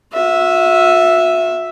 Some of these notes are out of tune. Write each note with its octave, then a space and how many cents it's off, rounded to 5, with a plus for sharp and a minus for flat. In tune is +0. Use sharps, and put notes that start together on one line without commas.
F#4 -45 E5 +0